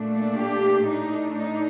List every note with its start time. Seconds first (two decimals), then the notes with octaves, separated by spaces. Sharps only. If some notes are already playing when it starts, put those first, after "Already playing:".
Already playing: A#2 A3 D4
0.36 G4
0.87 A2 A3 D4 D#4
1.39 D#4